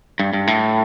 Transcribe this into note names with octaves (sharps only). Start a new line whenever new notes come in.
G2
G2
A2